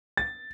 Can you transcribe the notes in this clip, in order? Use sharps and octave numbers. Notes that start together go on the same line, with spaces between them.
A6